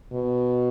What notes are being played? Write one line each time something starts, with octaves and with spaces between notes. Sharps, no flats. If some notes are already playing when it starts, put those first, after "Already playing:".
B2